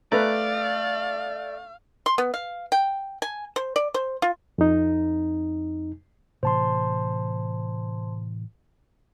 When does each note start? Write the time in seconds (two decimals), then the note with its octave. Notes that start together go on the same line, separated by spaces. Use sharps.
0.12 A3 B4 D5 F5 A#5
2.06 C6
2.18 B3
2.34 F5
2.72 G5
3.22 G#5
3.56 C5
3.76 D5
3.94 C5
4.22 F4
4.58 F2 D#4
6.43 A2 C3 E3 C5 A5 C6